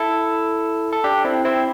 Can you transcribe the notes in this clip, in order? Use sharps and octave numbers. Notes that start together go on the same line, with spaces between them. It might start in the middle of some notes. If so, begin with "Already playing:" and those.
Already playing: E4 A4
A4
D4 G4
C4 E4
C4 E4